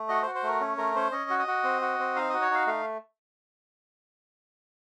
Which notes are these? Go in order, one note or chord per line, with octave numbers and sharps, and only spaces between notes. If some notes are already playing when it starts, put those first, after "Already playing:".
Already playing: A3
F#4 D#5
C5
F#4
C5
A3 A#4
C#4
A3 A#4
C#4 C5
C#4 D#5
F#4
D#5
F#4
C4
F#4
C4
D#4 F5
F#4 D#5
C#5
D#4 F5
A3 F5